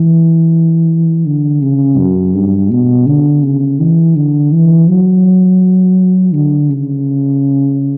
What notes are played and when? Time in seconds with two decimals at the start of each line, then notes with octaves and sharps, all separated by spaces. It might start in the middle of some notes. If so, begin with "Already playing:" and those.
Already playing: E3
1.26 D3
1.62 C#3
1.98 F#2
2.34 G2
2.71 B2
3.07 D3
3.43 C#3
3.80 E3
4.16 D3
4.52 E3
4.89 F#3
6.34 D3
6.70 C#3